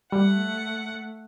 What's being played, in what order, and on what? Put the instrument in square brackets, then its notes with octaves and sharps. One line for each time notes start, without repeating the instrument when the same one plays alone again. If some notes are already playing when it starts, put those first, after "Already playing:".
[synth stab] G3 [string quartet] A3 F#5